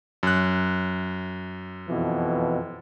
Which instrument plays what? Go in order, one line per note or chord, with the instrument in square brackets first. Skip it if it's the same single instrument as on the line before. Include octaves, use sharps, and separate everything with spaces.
[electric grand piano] F#2 F#6
[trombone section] F2 B2 E3